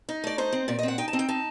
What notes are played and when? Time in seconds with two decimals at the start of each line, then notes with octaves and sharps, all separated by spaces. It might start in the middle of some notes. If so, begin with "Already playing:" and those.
0.09 D#4
0.24 A3 D5
0.38 D#4 C5
0.53 C4
0.68 A#2 D5
0.79 D#5
0.83 C4 F#5
0.98 D#4 G5
1.08 A5
1.13 C4
1.19 G5
1.29 D#4 A5